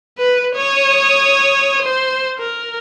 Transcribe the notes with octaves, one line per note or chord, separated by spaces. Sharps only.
B4
C#5 D#6
C5
A#4